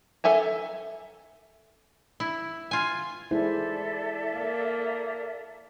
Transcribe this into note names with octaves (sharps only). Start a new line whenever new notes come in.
A4 E5 G#5 A#5
E4
F4 G#5
E3 G#3 E4 A4 C5 D5 E5
A#3 F5